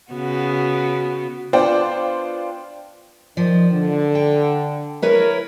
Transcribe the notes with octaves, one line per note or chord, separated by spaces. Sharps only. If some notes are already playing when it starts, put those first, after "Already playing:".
C#3 B3 F#4
B3 D4 F4 C5 D5 G5
D#3 F3 D5
D3
G5
E4 A#4 B4 C#5